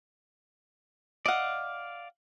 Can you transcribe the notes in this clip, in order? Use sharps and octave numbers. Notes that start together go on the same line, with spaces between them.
D5 D#5 F5 F#5